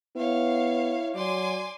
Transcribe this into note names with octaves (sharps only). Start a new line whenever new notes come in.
B3 E4 C#5 F5
F#3 D5 G#5 C6 D6